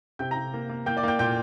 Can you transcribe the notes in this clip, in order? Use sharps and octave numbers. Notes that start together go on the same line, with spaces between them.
C3 G5 G6
A#5 A#6
C3
A#3
A#3
A#3 G5 G6
D5 D6
A#3 G5 G6
A#2 G5 G6